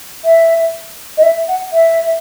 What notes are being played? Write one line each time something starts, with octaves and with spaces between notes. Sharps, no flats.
E5
D#5
E5
F#5
E5